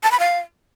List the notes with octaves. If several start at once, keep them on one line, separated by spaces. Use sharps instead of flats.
A5
B5
F5